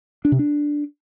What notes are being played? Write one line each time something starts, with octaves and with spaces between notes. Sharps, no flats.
D4
C3
D4